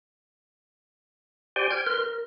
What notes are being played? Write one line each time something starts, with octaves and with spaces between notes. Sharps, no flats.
G4 C5 D5 G5 G#5 C6
G5 F6 G6 G#6
A#4 B4 C6 F6
A#4